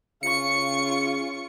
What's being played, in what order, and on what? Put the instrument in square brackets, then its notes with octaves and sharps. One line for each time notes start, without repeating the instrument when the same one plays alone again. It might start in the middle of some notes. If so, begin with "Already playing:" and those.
[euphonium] C#3 [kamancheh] F4 C#6 [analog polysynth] C#7